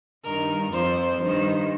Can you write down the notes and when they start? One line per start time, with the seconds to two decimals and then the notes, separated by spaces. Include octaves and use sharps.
0.24 G2 D#3 A#4
0.72 F2 F3 C5
1.20 G2 D#3 C5